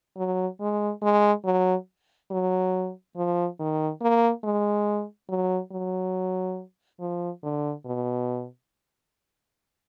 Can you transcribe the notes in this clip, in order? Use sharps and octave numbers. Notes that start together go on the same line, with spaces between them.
F#3
G#3
G#3
F#3
F#3
F3
D#3
A#3
G#3
F#3
F#3
F3
D3
B2